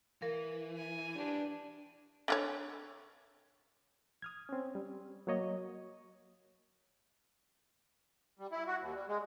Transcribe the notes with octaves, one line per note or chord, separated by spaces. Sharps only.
E3 A#4 F5
G#5
D4 G4 B4
D3 F4 C#5
D#6 F6 G#6
C4 C#4
G3
F#3 A#3 C#5 D#5
G3
E4
F#4
D#2
G3
G#3